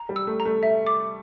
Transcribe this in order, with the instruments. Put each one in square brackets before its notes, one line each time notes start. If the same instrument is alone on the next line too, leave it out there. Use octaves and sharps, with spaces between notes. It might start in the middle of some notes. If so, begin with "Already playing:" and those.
Already playing: [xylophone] A#5
[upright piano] G3
[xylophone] E6
[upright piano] A3
[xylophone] A#5
[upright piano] A3
[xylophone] E5
D6